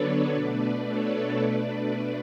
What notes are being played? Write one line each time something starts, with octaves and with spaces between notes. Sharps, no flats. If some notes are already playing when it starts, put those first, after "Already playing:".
Already playing: D3 F#3 B3 D4 A4 B4 C#5 D5
B2 A3 D4 B4 D5
A4 C#5
B2 A3 D4 B4 D5